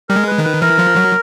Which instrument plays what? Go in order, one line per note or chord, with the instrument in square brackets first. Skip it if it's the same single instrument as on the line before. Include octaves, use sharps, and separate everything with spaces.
[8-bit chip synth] G3 [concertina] A#4
[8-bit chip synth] G#3
[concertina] B4
[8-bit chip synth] D#3
[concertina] B4
[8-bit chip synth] E3 [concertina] A#4
[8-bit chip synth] F3
F#3